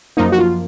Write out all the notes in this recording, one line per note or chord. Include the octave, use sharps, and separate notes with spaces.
F#2 F3 A#3 D#4
F#4
F4